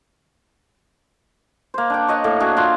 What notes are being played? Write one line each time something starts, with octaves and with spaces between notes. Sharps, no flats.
A#3 C5
D4 G5
C#5 D#5 F#5
A2 A#3
D4 F#4 G#4 E5
D4 F4